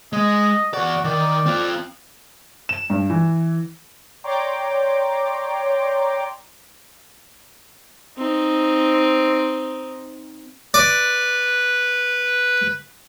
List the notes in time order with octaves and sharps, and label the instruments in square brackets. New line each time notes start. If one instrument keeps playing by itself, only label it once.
[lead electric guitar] G#3 [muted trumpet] D#5
[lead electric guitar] E2 D5 [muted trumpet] F#4
[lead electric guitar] D#3 [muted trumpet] D5
[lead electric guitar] C4 F4
[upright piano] E7
G2
E3
[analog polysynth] C#5 D5 G5 A#5 C6 D6
[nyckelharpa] C4 D#4
[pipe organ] B4 [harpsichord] D5